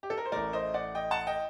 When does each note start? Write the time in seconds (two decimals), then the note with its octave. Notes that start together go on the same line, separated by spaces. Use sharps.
0.03 G4
0.10 A4
0.17 A#4
0.25 C5
0.32 A1 A2 A3 A#4 D5
0.53 C5 D#5
0.74 D5 F#5
0.95 D#5 G5
1.11 F#5 A5
1.27 D#5 G5